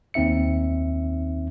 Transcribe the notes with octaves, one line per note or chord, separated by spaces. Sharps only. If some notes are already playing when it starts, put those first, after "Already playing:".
D#2 C4 D#4 E5 C#7